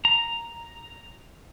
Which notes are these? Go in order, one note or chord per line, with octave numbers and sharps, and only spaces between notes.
A#5